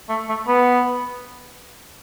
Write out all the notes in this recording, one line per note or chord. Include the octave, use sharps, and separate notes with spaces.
A3
A3
B3